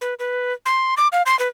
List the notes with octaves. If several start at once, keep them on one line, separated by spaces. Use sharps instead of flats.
B4
B4
C6
D6
F5
C6
B4